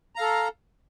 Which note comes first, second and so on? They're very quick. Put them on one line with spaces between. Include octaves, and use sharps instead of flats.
A#5 F5 A4